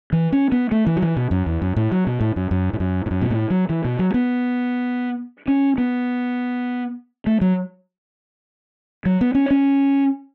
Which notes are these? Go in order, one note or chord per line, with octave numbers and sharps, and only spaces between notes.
E3
C#4
B3
A3
E3
F#3
E3
B2
F#2
E2
F#2
A2
F#3
B2
A2
F#2
F#2
A2
F#2
A2
F#2
B2
A2
F#3
E3
B2
F#3
B3
C#4
B3
A3
F#3
F#3
B3
C#4
C#4